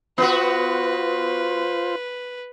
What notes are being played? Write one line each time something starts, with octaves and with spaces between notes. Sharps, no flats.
B3 F4 F#4 B4 C5